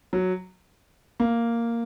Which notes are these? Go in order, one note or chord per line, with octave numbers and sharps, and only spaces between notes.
F#3
A#3